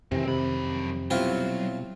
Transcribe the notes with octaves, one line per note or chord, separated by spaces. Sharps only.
F2 C3 D#3 E3 C4
F#2 C3 B5
B2 F#3 G3 C4 E4 F4